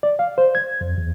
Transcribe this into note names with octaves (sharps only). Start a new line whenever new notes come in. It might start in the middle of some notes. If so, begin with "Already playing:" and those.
D5
F5
C5
G#6
F2
E2